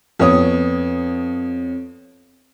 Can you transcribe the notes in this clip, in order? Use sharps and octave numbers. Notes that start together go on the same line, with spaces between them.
F2 B3 C#5 D#6